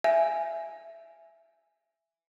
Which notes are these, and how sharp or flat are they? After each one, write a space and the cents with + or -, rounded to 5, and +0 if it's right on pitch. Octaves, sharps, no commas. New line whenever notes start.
E5 +10 G#5 +0